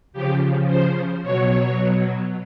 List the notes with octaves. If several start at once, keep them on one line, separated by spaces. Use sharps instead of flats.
C#3 F3 G4
C5
B2 F#3 C#5